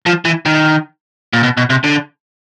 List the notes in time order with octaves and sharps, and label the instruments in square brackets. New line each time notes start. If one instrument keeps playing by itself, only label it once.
[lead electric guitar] F3
E3
D#3
A#2
B2
B2
C3
D3